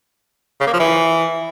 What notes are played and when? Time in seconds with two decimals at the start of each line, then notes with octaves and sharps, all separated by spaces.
0.60 C#3
0.67 A#3
0.73 F3
0.80 E3